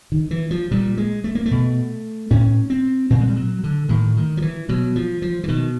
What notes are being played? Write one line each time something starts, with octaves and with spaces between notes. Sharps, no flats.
D#3
E3
F3
A#2 G3
G#3
A3
A#3
A3
B2
A2 C#4
C4
A#2 C4
G#3
G3
F#3
D3
A2 D#3
D#3
F3
E3
B2 F#3
F3
F3
E3
B2 D#3